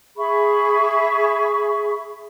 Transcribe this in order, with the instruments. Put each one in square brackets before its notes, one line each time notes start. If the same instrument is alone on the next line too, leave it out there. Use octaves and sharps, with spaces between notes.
[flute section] G#4 E5 B5 C#6